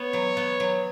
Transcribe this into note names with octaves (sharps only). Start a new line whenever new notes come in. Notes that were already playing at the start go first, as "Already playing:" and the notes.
Already playing: B3 C#5
F#3
B3
F#3